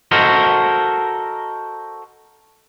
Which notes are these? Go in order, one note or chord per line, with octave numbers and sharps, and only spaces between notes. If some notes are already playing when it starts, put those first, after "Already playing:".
F#4 A4 A#4 C5 D#5